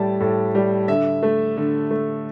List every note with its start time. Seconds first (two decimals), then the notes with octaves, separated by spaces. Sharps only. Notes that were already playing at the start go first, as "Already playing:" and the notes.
Already playing: A2 G3 A5
0.20 A2
0.55 G3
0.88 D3 E5
1.23 A3
1.57 D3
1.91 A3